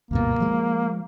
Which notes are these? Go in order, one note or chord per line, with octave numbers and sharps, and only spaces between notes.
D2 G2 B2 A#3
F3 G#3